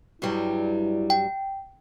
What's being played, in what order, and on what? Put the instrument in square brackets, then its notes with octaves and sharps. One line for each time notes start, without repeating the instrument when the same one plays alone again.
[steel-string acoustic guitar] G2 F#3 G3 [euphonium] E4
[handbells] G5